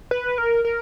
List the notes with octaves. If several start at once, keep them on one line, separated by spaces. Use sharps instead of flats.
B4
A#4
A#4